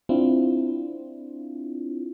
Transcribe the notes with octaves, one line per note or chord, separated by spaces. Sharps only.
C4 D4 E4 F4